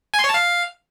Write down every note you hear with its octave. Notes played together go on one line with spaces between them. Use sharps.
G#5
C6
C#5
A5
F5